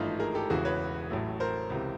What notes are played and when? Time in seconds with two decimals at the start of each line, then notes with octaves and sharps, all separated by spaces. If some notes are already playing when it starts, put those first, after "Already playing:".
Already playing: G#1 G2 E3 A3 D#4 F4
0.19 G#4 A#4
0.35 G4 A4
0.50 E1 E2 C#3 E3 F#4 G#4
0.65 B4 C#5
1.10 A1 A2 F#3 A3
1.40 A#4 C5
1.70 C#2 C3 E3